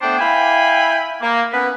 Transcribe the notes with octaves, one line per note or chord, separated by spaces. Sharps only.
A3 B3 D4 C5 G5
E4 F5 G5 G#5 B5
A#3
B3 C#4 B4